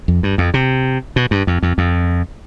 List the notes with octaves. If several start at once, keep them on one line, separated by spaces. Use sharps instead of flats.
F2
G2
F2
C3
B2
G2
F2
F2
F2